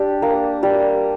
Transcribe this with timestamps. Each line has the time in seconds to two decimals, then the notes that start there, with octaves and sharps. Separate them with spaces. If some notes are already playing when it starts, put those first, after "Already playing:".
Already playing: D4 G4
0.22 A#3
0.63 G3